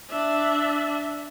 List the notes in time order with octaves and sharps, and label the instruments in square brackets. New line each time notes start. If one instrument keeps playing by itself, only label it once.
[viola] D4 E5